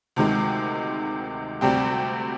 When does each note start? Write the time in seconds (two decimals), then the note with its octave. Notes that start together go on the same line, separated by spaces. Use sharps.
0.16 D2 C3 D#3 G#3
1.61 D2 C3 G3 C4 G4